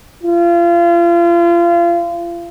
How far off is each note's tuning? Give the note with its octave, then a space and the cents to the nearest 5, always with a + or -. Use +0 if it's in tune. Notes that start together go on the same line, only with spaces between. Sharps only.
F4 -30